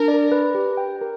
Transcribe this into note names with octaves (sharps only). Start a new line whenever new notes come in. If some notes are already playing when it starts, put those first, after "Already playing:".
Already playing: D4 A#4
D5
B4
G4
G5
A#4